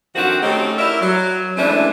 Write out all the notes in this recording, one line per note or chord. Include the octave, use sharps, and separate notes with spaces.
D3 D#3 F3 C4 F#4
A3 C4 C#4 D#4 G4 A4
E4 A#4 D5 E5
F#3
E3 F3 G#3 A3 C#4 D4